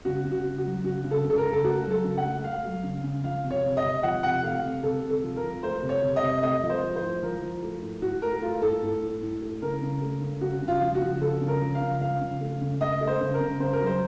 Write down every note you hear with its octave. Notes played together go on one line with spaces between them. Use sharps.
C#3 F#4
C#3
F#4
C#3
F#4
F#3
C#3 F#4
C#3
A4
C#3
A4
A#4
C#3
A4
A3 F#4
F#3
A4
C#3
F#5
A3
A3 F5
F#3
C#3
C#3
F3 F5
C3
C#5
C3
D#5
C3
F3 F#5
C3 F#5
A3 F5
C3
C3 A4
C3
A4
F3
A#4
F3
A3 C5
C3
C#5
C3
D#5
C3
A3 D#5
F3
C5
F3
C5
A2
F3 A#4
F3
A3
A2
A2 F#4
A3 A#4
A3 F4
A2 A4
A2
A2
A2
A3
C#3 A#4
C#3
A3
C#3
C#3 F#4
C#3
F4
F3
F#4
C#3
C#3 A4
C#3
A#4
F3
F5
C#3
F3 F5
C#3
A3
C#3
A3 D#5
A3
C5
C#3
A#4
C#3
C#3 C5
A#4
F#3
C5